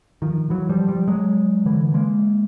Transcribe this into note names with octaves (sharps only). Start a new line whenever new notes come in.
D#3 F3
E3 F#3
F3 G3
F3 G3
F#3 G#3
D3 E3
G#3 A#3